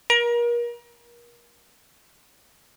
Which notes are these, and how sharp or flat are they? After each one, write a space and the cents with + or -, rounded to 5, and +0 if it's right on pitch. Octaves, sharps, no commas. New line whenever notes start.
A#4 +35